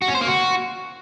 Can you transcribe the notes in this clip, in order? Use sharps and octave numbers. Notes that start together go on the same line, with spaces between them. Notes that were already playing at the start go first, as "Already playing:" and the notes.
F#4
C#4
C5
A#3
F#4